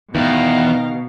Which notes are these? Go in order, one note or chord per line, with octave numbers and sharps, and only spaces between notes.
E2 B2 D#3 F5 G5 A#5